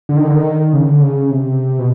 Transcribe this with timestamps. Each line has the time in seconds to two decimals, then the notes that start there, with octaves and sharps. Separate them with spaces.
0.09 D3
0.17 D#3
0.26 D3
0.36 D#3
0.73 C#3
0.87 D3
1.01 C#3
1.30 C3
1.79 B2